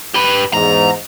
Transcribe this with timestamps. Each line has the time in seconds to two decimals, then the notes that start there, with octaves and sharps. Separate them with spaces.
0.14 G4 B4
0.53 E2 G#2 A#5